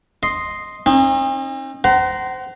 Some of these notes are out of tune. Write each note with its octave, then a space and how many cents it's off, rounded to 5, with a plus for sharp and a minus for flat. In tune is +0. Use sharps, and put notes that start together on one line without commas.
D#5 +0 C6 +0
C4 +45 D#4 +0
C5 -15 F#5 +40 A#5 +0